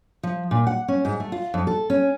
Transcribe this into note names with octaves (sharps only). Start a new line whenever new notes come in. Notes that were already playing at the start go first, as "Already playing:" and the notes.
F3
A#2
F#5
C#4
G#2
A3
F4
F2
A4
C#4